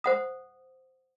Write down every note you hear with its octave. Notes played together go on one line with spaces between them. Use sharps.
C5 F#5 D#6